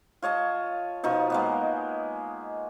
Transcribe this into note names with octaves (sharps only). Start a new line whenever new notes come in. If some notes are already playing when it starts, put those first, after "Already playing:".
F4 C#5 D#5 A5
B2 F3 D#4 C#6
G#3 A#3 B3